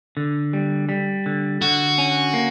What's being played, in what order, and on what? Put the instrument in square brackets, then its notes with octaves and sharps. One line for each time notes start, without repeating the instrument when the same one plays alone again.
[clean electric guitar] D3
G3
G3
D3
[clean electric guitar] D3 [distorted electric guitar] F#4
[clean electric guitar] C#4
A#3